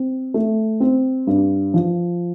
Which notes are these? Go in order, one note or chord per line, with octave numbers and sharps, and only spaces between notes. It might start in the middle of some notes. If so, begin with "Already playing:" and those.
Already playing: C4
A3
C4
G2
F3